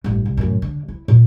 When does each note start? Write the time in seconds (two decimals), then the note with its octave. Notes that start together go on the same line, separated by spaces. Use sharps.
0.04 A1 G2
0.26 C2
0.37 F#2 A2
0.62 D3
0.88 E4
1.08 A#2